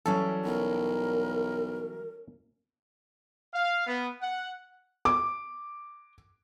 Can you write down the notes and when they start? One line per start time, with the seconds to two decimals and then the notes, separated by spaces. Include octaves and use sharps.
0.06 E3 F#3 G3 C#4 A4
0.45 B1 A#4
3.53 F5
3.86 B3
4.20 F#5
5.05 D6